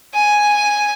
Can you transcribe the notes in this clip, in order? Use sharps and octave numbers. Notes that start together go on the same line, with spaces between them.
G#5